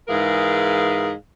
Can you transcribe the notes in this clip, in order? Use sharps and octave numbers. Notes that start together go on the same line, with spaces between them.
G#2 E3 G#4 A#4 F5